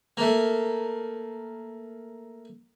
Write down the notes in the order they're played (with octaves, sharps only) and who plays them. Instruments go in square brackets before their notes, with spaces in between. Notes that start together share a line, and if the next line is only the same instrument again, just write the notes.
[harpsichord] A3 A#3